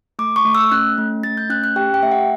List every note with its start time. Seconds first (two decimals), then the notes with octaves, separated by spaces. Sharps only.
0.19 A3 D6
0.36 C#6
0.45 A3
0.55 E6
0.71 C#4 F#6
0.98 A3
1.23 A3 A6
1.37 G6
1.50 C#4 F#6
1.64 F#6
1.76 G4 G5
1.94 G5
2.02 A3 E5
2.12 F#5